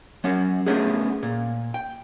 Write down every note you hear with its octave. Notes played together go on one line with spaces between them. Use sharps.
F#3 C#4 F#5
A3 B3 C#4 D4 F#4 G#4
A#2
G5